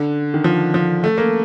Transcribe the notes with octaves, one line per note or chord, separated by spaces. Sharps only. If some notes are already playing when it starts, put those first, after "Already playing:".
Already playing: D3
D#3
F3
F3
A3
A#3